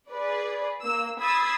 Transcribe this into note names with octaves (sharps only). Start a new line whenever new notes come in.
G#4 B4 D5
A#3 E6
B5 D#6 E6 G#6 A6 C7